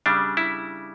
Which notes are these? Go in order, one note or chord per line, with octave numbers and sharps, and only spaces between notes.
C#3 G3 D4
E4